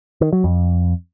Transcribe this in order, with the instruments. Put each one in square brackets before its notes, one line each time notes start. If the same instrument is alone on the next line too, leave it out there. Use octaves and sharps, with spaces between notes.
[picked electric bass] D#3
F#3
F2